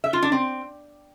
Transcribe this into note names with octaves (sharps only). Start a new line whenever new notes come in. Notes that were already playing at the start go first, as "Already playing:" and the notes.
E5
F4
D4
C4